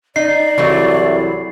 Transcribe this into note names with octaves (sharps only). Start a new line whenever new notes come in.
D#4 D5 C7
C2 E3 F#3 A3